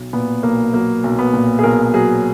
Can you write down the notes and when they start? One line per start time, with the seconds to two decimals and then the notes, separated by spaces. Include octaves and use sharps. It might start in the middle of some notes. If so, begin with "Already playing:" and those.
Already playing: B1
0.13 A#2 B3
0.43 B1 A#3
0.73 F#3 A#3
1.04 B1
1.19 B3
1.34 A#2
1.59 G#4
1.63 B1 A#4
1.94 F#3 G#4